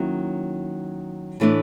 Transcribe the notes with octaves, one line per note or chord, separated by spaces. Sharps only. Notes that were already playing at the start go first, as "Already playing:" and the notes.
Already playing: D#3 F#3 A#3 C#4 E4
A2 E3 A3 D4